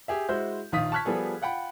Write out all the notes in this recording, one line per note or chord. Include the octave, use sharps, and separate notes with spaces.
G4 G#4 E5
G#3 E4 F#4 C5 E5 G6
A#1 D#3 F4 D#6 B6
A5 C#6 F6 F#6 G#6 B6
F3 G3 B3 G#4 A4
F4 F#5 G5 B5